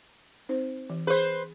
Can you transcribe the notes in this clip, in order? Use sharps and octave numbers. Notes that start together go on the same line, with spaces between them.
C4 D#4 C5
E3
G#4 B4 C5